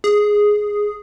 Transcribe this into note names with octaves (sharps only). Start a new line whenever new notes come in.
G#4